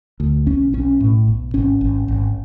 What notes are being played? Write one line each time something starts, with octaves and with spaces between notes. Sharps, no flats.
D2
B1 C#4
B1 C#4
A2
B1
G#1 C#4
G#1
G#1